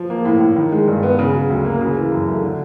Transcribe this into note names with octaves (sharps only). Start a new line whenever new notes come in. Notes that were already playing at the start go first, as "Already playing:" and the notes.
Already playing: F3
A#3
A2
A2
D#3
G#3
G2
B3
C#3
F#3
D2
A#3
C#3
E3
F#2
A3
D3